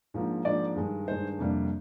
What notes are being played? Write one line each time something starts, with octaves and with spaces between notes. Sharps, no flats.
G#2 F3 A#3 D4
G#2 F3 A#3 D4 D5
G2 D#3 G#3 D4
G2 D#3 G#3 D4 C5
F2 C3 G3 A#3 D4